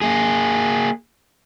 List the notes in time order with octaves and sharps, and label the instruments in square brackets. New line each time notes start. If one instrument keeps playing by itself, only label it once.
[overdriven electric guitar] A#3 G#4